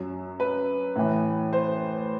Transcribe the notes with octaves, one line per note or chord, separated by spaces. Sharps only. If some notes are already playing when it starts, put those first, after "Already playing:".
Already playing: F#2 F#3
B4
A2 E3
C5